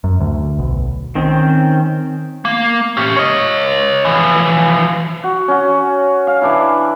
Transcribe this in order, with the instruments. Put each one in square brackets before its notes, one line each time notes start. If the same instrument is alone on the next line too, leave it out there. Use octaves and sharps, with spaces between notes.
[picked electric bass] F#2
D2
B1
[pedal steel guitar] D#3 C4 C#4
[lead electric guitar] A#3
C#4 G4
C#5 D#5
E3 F3
[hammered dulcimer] F#4
C#4 F#4
F5
E3 D4 E4